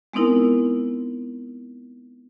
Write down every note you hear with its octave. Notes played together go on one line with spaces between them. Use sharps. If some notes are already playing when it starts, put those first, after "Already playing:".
G#3 B3 C4 D#4 E4 A#4